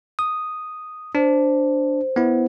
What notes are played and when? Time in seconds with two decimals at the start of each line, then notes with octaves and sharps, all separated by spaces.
0.19 D#6
1.15 D4 C5
2.16 B3 E4